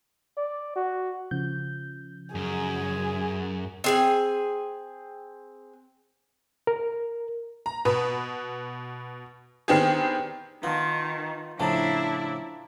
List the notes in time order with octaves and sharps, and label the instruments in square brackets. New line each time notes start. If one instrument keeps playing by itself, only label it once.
[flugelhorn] D5
F#4
[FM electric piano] C#3 F3 G6
[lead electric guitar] F#2 [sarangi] G#4
[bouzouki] C4 G#4 G#5
[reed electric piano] A#4
[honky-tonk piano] A#5
B2 B4 D#6
D#3 B3 C4 D4 G4 G#4
[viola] D#3 [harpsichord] B3 [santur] F4 A5
[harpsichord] A2 C#3 F3 [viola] D4 E4 [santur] A5 A#5